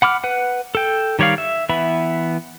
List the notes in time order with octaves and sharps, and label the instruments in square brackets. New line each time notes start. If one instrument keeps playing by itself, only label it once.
[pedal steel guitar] F#5 B5 D6 F6
B4 F#5
A4 G5
D#3 G3 C#5 D5 F5
E5
E3 B3 E5 B5